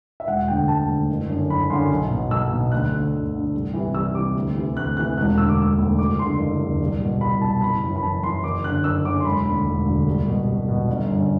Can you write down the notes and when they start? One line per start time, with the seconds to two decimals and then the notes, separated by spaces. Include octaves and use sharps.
0.20 E5
0.27 E1 F#5
0.48 D2 D3 G5
0.68 E1 A5
0.89 D2 D3
1.10 F#1
1.30 F#2 D3
1.49 F#1 B5
1.70 F#2 D3 C6
1.90 B1
2.11 B2
2.31 B1 E6
2.52 B2
2.72 D2 F#6
2.92 D3
3.12 D2
3.34 D3
3.54 C2
3.74 C3 E3
3.94 C2 E6
4.15 C3 E3 D6
4.36 D2
4.56 C3 E3
4.76 D2 F#6
4.97 C3 E3 F#6
5.17 E1 F#6
5.38 D2 D3 E6
5.49 D6
5.58 E1 E6
5.79 D2 D3
5.98 F#1 D6
6.19 E2 D3 C6
6.40 F#1
6.60 E2 D3
6.80 C2
7.01 B2
7.21 C2 B5
7.41 B2 A5
7.52 A5
7.62 F#1 B5
7.82 F#2 E3
7.96 B5
8.02 F#1 A5
8.23 F#2 E3 C6
8.44 F#1 D6
8.64 F#2 D3 F#6
8.84 F#1 E6
9.05 F#2 D3 D6
9.20 C6
9.25 E1 B5
9.45 D2 D3 B5
9.67 E1
9.86 D2 D3
10.07 C2
10.27 B2
10.48 C2
10.68 B2
10.88 G1
11.09 F#2 D3